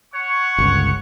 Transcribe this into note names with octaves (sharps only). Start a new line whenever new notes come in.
C#5 F#5 C#6
G1 C#2